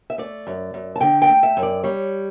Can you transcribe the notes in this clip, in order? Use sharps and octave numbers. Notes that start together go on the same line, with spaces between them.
E5
A3 D5
F#2
F#2
A5
D3 G5
G5
A3
E5
F#2
D5
G3 C#5